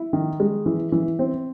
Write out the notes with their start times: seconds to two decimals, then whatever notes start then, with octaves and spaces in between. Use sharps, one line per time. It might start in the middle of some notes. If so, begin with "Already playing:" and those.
Already playing: E4
0.13 D#3
0.40 G#3
0.66 E3
0.92 E3
1.19 C4